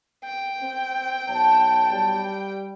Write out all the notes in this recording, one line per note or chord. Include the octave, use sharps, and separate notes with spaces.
G5
C4
B1 C#5 A5
G3